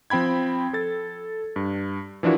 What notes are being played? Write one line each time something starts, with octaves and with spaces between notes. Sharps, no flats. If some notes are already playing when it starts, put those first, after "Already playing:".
F3 C4 G5 B5 G#6
A4 A6
G2
E3 F3 D4 E4 F#4 A#4